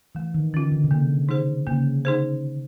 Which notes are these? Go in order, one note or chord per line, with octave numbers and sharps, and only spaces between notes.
E3 A3
D#3
D3 C#4 F4
D3
C3
C#3 A#3
D#4 G#4 C5
C#3 A#3
D#4 G#4 C5